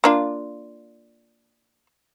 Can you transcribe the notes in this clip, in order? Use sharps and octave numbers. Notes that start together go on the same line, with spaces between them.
A#3 D4 F4